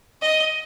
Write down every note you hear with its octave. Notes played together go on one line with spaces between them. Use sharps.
D#5